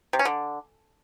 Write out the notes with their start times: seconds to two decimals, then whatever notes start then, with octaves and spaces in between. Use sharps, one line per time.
0.13 C3
0.19 C#4
0.25 D3